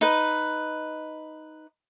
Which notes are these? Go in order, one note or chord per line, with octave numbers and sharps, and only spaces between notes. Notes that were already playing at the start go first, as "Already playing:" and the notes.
D#4 B4